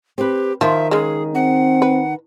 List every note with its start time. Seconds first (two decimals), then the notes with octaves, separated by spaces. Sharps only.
0.18 C4 G4 B4
0.61 D#3 F3 E5
0.91 C#3 G#3 G#4
1.35 C4 F#5
1.82 B4